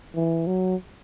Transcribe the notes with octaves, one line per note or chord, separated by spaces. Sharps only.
E3
F#3